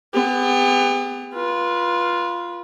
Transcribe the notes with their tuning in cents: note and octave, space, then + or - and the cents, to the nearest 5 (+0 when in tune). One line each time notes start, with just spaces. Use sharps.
B3 +35 G4 +45
F4 +0 B4 -30